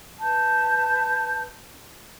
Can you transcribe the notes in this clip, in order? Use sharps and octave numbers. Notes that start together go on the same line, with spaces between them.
B4 A5 G6